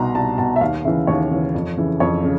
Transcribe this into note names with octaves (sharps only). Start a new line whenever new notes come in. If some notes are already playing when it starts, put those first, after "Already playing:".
Already playing: C2 B2 A#5 C6
C2 A5
B2 A5
E5
D#2 F5
C#3 E3 E5
D#2 C#5
C#3 E3
F2
C#3 E3
F2 C#5
C#3